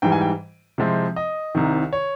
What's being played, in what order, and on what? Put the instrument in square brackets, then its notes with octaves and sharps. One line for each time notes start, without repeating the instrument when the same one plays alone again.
[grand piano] G#2 E3 G3 G5
G#5
G5
C3 F3 G#3 C4 E4
D#5
C2 C3 D#3
C#5